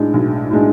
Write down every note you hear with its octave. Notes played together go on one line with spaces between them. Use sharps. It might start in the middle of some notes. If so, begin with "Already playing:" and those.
Already playing: B1 A2 G#3 D4
B1
A2 G#3 D4